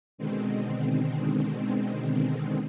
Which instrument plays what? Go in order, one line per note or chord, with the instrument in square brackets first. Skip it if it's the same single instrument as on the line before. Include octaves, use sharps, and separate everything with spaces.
[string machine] B2 D3 D#3 G#3 C4